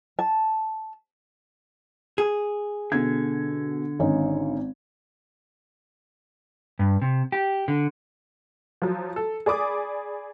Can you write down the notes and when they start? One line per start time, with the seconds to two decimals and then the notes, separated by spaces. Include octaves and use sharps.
0.19 A5
2.18 G#4
2.92 B2 D3 G#6
3.99 G#1 C#4 D#4
6.79 G2
7.02 C3
7.32 G4
7.68 D3
8.82 F3 F#3
9.16 A4
9.46 G#4 D5 B5 D6 D#6